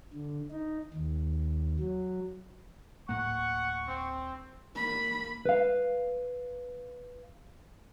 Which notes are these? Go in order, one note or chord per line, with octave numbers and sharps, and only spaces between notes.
D3
D#4
D#2
F#3
D1 A2 A#3 F#5 C#6
C4
A#3 B5
B4 F5